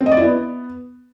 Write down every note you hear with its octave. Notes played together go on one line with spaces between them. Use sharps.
C4
D#5
D5
E4
B3